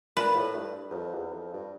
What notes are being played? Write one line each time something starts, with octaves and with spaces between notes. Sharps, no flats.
A#2 B4
A2
G2
E2
F2
E2
F2
G2